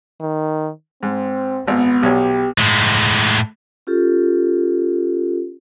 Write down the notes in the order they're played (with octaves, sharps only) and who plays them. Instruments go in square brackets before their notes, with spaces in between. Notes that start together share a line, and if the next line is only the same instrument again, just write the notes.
[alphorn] D#3
[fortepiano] G#2 [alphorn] C4
[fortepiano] G#1 [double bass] B3
[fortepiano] B1 C#5 [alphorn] G4
[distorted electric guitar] A2 G#3
[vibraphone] C#4 F4 G4 A4